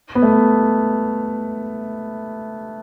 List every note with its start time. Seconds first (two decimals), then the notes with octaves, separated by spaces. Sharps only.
0.15 B3
0.23 A3